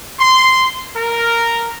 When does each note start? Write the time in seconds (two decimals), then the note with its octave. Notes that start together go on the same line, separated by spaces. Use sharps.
0.19 C6
0.94 A#4